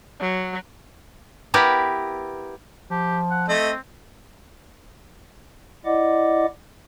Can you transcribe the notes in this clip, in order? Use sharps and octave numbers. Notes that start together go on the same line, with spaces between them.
F#3
B3 E4 G4 A#4 B4
F3 G4
F#5
A3 C4 D#5
E4 D5 D#5 F#5 D6